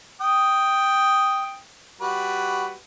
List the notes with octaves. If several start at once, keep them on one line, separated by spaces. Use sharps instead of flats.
G5 D#6
G3 F#4 B4